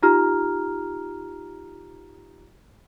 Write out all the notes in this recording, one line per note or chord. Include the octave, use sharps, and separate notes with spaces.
D#4 F4 G4 A#5 F6